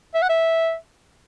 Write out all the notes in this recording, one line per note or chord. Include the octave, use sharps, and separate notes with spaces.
E5
F#5
E5